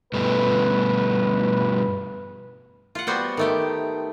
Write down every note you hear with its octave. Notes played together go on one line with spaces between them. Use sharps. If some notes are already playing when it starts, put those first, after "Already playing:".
C#2 G2 B2 A3 B4
F4 F#5
G3 B3 F#4 C5
D#3 A3 G4